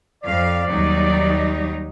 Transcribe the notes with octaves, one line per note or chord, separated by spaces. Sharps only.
F2 D5 F5
D#2 F#3 G3 D#4